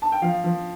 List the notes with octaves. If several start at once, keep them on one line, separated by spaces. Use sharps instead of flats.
A5
G5
F3 F5
F3